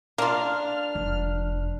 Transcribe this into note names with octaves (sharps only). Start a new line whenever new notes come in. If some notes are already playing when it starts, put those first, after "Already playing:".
A#3 D4 F4 F6
F1